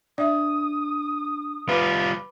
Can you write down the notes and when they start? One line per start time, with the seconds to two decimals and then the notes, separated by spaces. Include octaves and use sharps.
0.18 D4 D5 E5 D#6
1.69 G3 F4 B4 B5 D6